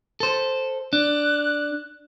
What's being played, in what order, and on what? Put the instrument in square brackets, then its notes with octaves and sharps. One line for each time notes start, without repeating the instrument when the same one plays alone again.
[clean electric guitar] A4 C5
[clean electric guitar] D4 [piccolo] F#6